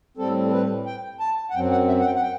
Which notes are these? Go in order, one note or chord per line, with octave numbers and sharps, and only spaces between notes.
A2 G3 C4 A4
A4
B4
G5
A5
F#5
F#2 F#3 C4 G5
F#5
E5
F#5
G5
F#5
G5